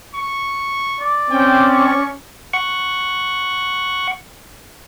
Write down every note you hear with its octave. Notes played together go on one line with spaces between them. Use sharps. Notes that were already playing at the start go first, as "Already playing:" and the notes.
C#6
D5
C4 C#4 G5
C#6
F#5 C#6